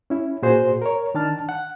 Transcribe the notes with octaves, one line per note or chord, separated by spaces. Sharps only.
C#4 E4
A#2 F#4 G#4 C5
A#4 C#5
D#3 D4 A5 F6
F#5